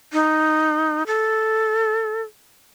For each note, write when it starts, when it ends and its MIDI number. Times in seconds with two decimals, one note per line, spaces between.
0.13 1.03 63
1.07 2.22 69